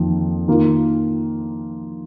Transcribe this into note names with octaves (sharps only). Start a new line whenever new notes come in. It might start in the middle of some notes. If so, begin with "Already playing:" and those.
Already playing: F2 D#3 A#3 F4
D#3 A#3 F4